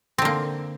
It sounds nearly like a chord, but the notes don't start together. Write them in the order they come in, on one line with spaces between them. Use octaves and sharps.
C4 D3 A#3